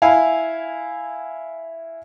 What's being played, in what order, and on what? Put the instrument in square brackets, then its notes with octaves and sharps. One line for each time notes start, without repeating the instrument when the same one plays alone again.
[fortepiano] E4 F5 G#5